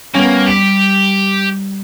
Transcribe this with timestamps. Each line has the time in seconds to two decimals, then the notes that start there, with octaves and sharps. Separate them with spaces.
0.14 G3 A#3 B3 C#4
0.47 G4 B6 F#7